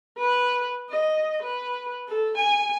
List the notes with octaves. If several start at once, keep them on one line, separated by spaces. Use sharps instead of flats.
B4
D#5
B4
A4
G#5